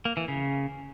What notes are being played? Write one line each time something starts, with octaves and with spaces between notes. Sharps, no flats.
A#3
E3
C#3